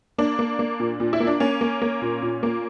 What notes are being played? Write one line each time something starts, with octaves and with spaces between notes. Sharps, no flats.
A#3 D4
A#3
A#3
A#2
A#2
E4
A#3
D4
A#3 C#4
A#3
A#3
A#2
A#2
A#3